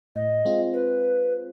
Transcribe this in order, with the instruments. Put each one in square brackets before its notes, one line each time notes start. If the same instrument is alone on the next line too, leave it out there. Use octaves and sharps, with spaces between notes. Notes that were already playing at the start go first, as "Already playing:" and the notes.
[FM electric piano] A2 [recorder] D#5
[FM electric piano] G#3 C4 F4
[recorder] B4